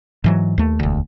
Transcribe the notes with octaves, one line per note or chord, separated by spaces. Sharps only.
G#2 E3 F#3
D#2 A3
E1 D2